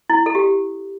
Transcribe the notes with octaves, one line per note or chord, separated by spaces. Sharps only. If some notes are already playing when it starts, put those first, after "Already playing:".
E4
A4
G4